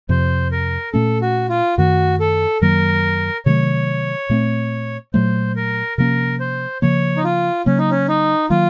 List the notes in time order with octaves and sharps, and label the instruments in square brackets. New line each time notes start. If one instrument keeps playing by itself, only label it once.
[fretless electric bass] F2 C3 F3 [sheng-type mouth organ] C5
[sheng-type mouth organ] A#4
[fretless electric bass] A#2 A3 C#4 [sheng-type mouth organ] A4
[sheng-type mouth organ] F#4
F4
[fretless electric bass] F#2 D#3 A3 [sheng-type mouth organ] F#4
[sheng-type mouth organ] A4
[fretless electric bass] F#2 D#3 F#3 A#3 [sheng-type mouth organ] A#4
[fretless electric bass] C3 D#3 F#3 A3 [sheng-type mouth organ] C#5
[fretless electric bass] A#2 A3 C4
[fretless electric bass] A#2 F#3 A3 [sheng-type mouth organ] C5
[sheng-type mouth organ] A#4
[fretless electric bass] C3 F3 A#3 C#4 [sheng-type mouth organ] A#4
[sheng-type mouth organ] C5
[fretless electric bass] C#3 F3 A#3 [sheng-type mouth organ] C#5
[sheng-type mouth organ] D#4
F4
[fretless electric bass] C#3 F#3 A#3 [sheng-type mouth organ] C#4
[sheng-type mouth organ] D#4
C#4
D#4
[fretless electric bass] D#3 F#3 A#3 [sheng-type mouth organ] F4